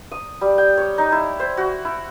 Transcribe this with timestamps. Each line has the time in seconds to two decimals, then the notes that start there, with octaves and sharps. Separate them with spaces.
0.11 D#6
0.41 G3
0.58 G5
0.78 C#5
0.98 D#4
1.12 E4
1.40 C5
1.57 F#4
1.85 E4